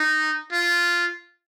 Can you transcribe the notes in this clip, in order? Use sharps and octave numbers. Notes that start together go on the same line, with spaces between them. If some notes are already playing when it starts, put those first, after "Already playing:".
Already playing: D#4
F4